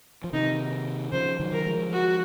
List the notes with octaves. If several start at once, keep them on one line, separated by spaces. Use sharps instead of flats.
F3
C3 D#3 D#4
C#3 F3 C5
D#3 F#3
A#4
F3 G#3
F#4